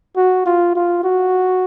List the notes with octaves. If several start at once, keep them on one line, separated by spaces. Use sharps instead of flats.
F#4
F4
F4
F#4